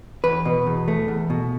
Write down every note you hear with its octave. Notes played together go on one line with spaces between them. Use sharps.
E2 B4
B2
E2
A3
E2
B2